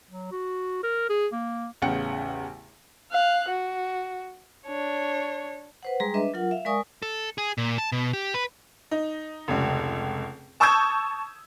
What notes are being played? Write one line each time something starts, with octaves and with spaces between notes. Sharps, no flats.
F#3
F#4
A#4
G#4
A#3
A1 E2 C#3 F#5 G5 C#7
F5 F#6
F#4
D4 C#5
B4 C5 F#5
G3 G#3 G#4 A#5 C6
D4 B4 D#5 E5
F#3 F4 A#4 F#5
E5 F5
G#3 A#4 D5 G#5 C#6 D#6
A4
G#4
A#2
A5
B2
G4
B4
D#4
F1 C#2
A5 C#6 D#6 E6 G6 G#6